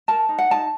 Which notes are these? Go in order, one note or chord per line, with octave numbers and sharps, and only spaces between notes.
A#4 A5
D#4
F#5
D#4 A5